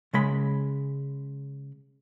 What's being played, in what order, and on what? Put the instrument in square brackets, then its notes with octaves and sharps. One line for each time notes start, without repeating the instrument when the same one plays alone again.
[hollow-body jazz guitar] C#3 G#3 B5